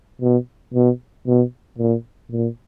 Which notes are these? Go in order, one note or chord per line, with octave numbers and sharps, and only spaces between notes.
B2
B2
B2
A#2
A#2